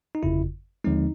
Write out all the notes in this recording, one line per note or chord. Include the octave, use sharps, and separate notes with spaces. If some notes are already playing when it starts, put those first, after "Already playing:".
D#4
G1 F2 C#3 E4
D#2 D3 F3 G#3 C4 D#4